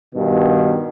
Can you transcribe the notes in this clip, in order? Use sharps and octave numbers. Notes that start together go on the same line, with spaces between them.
G2 B2 D#3